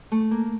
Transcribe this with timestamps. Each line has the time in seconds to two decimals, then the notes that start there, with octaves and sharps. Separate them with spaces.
0.12 A3
0.31 A#3